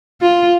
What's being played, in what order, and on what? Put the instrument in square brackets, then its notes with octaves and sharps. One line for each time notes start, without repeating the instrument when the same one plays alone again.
[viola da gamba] F4